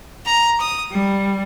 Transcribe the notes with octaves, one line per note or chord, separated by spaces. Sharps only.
A#5
D#6
G3